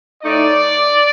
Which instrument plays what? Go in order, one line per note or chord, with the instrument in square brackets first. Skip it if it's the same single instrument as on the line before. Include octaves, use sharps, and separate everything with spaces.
[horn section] A2 A3 D#4 D5